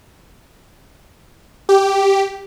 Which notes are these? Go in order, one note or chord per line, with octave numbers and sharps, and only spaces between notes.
G4